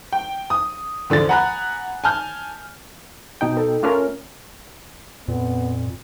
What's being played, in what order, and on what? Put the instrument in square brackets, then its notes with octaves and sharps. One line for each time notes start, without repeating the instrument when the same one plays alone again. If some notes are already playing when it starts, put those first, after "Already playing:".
[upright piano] G5
D#6
E2 D3 F3 A6
F#5 G#5 A#5 B5 F#6
G#5 A5 F6 G6
[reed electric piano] B2 D#4 G5
[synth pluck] A4
[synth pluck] A3 C#4 A#4 [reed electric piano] F4 F6
[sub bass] F2 [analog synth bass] A#2 [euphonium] B3